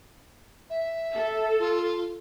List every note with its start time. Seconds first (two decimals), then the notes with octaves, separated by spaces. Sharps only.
0.70 E5
1.14 A4
1.59 F4